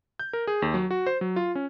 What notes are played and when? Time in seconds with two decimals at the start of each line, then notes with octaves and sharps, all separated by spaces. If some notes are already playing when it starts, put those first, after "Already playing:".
0.19 G6
0.33 A#4
0.47 G#4
0.62 D#2
0.74 F#3
0.91 F#4
1.07 C5
1.21 F#3
1.36 F4
1.55 C#4